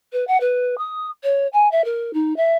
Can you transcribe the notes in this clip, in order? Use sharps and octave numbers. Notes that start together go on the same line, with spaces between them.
B4
F#5
B4
D#6
C#5
G#5
E5
A#4
D#4
E5